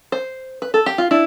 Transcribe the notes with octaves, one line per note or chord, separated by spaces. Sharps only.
C5
B4
A4
G4
F4
D4 E4